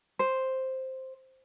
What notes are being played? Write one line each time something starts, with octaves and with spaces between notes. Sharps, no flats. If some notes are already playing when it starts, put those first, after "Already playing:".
C5